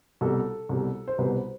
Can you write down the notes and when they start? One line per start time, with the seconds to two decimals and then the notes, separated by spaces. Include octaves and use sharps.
0.21 C2 B2 G3 A4
0.69 C2 B2 G3
1.08 C5
1.18 C2 B2 G3 B4
1.35 C5